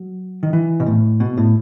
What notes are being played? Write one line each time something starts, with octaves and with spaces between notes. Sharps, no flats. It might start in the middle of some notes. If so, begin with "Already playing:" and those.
Already playing: F#3
D#3
E3
B2
A2
B2
A2